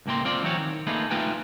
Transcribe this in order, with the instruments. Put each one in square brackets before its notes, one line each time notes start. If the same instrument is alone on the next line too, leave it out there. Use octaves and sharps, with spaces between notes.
[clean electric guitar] C#2 A2 A#3 G5 C6
C4 F4 D5
E3 F#3 C4 C#5
D#3
A3 A#3 D#4 F4 G#4 B4
A3 D#4 F4 B4 G5 G#5